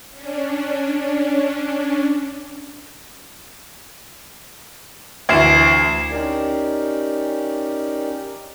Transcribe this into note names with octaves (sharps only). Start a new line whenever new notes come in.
C#4 D4
D2 E3 G#6 C7 E7
C#4 D#4 G4 A#4 D5